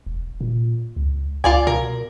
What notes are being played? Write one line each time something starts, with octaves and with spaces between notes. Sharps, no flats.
E1
A#2
C#2
C#2 F4 D5 G#5
B2 A#4